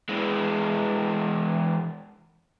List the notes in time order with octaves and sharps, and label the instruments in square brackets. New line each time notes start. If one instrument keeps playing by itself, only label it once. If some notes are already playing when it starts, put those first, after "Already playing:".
[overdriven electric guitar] E3 G#3